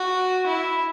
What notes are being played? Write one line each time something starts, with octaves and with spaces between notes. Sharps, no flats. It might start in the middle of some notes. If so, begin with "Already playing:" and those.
Already playing: F#4
E4